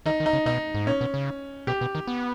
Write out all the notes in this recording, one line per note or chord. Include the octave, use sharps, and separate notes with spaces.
D#3 D#4
D#3
D#4
C#3
B2 D#4
G#2
A#2 C#4
B2
C#3
B2 G4
B2
D#3
B3